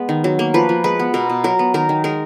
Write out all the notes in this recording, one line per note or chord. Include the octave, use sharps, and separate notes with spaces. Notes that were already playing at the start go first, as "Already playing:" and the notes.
Already playing: G#3 B3
D#3
F#3
A#3
F3 B4
F3
G#3 B4
B3
B2 A#4
B2
F#3 A#4
B3
D#3 A#4
D#3
G#3 A#4